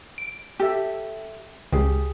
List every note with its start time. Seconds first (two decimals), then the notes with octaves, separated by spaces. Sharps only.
0.18 D7
0.60 G4 A4 E5
1.72 C#2 G4 G#4